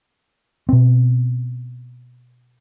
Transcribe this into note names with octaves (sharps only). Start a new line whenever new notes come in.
B2 C4